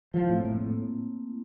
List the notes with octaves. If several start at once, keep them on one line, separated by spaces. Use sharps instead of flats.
F3 E4
A2 C4
A2 A#3
A2 A3